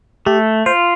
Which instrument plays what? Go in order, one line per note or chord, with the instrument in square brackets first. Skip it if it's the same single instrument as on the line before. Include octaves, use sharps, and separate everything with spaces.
[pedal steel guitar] A3 [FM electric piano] G4
[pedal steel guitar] F4 [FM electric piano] C5